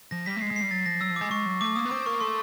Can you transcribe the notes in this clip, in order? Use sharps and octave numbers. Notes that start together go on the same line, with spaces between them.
F3 A#6
G3 B6
A3
G#3 C7
G#3
G3 C7
F#3 A6
F3 A#6
F#3 E6
F3
G#3 D6
G#3 C#6
F#3
A3 D6
A#3 D#6
B3
C4 D6
A#3 C#6
A3 C6